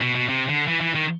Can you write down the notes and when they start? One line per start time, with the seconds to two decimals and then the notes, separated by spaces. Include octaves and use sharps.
0.02 B2
0.15 B2
0.29 C3
0.49 D3
0.68 E3
0.81 E3
0.95 D#3